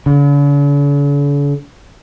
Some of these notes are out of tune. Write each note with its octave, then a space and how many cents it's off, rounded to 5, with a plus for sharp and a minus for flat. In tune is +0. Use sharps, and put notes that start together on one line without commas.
D3 -45